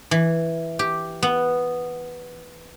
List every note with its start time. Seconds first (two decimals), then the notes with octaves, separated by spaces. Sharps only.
0.11 E3
0.79 G4
1.23 B3